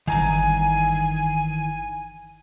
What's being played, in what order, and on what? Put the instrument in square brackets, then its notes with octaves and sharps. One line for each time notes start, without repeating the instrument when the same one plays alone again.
[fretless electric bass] D1 G1 [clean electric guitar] D#3 E3 A#5 [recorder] G#5